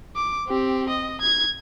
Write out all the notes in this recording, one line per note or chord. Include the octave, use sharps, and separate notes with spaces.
D6
C4 G4
D#5
G#6